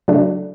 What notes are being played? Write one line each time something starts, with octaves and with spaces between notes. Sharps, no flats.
C#3 F#3 A3 D4